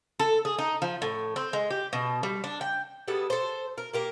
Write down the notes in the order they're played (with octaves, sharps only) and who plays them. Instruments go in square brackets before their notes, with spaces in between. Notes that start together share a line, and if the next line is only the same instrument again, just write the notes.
[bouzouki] A4
G#4
D#4
F3
A2
C4
G#3
G4
B2
G3
D4
G5
G3 G#3 B3 A4
A4 C5
A#4
A#3 G4 A#4